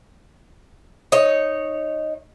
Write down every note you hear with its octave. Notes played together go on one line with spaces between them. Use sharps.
D#4 C#5